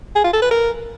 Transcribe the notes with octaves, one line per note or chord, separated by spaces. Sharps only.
G#4
F4
A4
B4
A#4